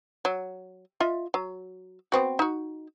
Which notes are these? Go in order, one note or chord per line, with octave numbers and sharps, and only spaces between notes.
F#3
F4 D#5 E5
F#3
B3 C4 F#4
D#4 F#4